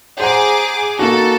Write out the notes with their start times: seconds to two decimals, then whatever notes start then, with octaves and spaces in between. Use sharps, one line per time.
0.20 G#4 C5 F#5 A#5 D6
0.99 A#3 D#4 F#4 A4